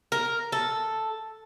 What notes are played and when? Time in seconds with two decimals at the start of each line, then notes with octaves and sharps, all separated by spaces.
0.12 A#4
0.52 A4